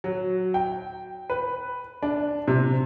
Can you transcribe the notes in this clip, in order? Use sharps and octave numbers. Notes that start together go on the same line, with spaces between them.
F#3
G5
B4
D4
C3